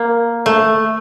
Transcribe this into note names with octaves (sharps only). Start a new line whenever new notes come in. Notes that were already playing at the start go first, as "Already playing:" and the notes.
Already playing: A#3
A3